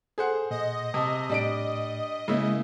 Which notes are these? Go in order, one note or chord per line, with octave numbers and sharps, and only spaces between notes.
G#4 A4 C5 F#5
A#2 D#5
C3 A5 D#6
A2 G3 D4 D7
C#3 G#3 A#3 E4